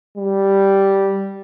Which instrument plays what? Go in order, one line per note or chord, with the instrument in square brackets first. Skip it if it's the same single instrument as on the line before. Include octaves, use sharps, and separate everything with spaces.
[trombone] G3